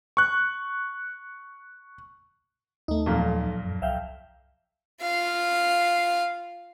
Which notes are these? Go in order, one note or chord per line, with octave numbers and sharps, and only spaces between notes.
C#6 F#6
D#2 A3 D#4
B1 F2 A#2
F#2
C2 E5 F5 G5
F4 F5